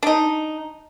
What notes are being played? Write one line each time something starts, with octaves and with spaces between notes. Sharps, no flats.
D4 D#4